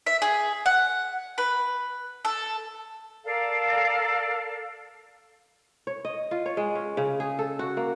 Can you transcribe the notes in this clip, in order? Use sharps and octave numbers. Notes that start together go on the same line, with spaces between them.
E5
G#4
F#5
B4
A4
A4 A#4 D5 F5
C#5
D#5
F4
C#5
G#3
C#4
C#3
G#4
A4
F#4
A#3